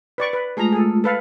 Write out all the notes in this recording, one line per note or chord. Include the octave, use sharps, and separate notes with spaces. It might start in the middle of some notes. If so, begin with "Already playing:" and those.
B4 D5 C#6
B4
G#3 A3 F4 G#4 A#5
G#4 A4
A4 B4 F5